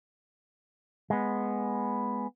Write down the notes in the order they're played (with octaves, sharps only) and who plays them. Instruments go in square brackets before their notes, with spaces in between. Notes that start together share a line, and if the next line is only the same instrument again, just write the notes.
[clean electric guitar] G#3 B3